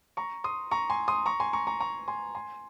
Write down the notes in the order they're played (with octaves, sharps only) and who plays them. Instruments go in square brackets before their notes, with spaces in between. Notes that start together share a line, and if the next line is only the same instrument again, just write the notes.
[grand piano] A#5 C#6
C6 D#6
A#5 C#6
G#5 C6
C6 D#6
A#5 C#6
G#5 C6
A#5 C#6
A#5 C#6
A#5 C#6
G#5 C6
G#5 C6